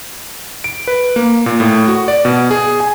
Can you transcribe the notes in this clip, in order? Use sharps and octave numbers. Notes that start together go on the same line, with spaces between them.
D7
B4
A#3
A#2
A2
F#4
D5
B2
G#4
G#5